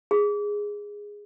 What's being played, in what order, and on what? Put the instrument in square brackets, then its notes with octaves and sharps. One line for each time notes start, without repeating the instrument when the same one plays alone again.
[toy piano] G#4